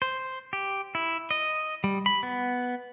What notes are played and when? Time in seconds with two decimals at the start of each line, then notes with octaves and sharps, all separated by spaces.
0.02 C5
0.53 G4
0.95 E4
1.31 D#5
1.84 G3
2.06 B5
2.23 B3